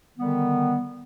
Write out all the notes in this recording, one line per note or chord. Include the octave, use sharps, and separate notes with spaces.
D3 D#3 G3 B3